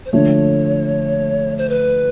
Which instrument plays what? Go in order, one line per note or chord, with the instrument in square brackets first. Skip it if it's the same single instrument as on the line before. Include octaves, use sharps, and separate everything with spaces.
[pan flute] C5
[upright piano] D3 F3 A3 [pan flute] C#5
[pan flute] C5
B4